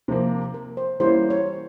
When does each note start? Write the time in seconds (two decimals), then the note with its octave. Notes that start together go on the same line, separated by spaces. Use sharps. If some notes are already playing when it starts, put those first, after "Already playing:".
0.08 C3 F3 A#3 A#4
0.54 A#4
0.77 C5
1.00 E3 G3 A#3 C#4 E4 C5
1.30 C#5